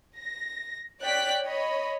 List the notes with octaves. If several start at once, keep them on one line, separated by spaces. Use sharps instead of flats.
A#6
C#5 D5 G5 F#6 B6
C#5 D#5 B5